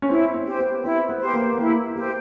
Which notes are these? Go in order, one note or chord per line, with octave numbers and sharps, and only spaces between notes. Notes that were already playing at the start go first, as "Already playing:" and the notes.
C#4
C4 E4
C4
G4 C5
B3
C4 E4
B3
G4 C5
A#3
B3
A#3 E4
A#3 G4 C5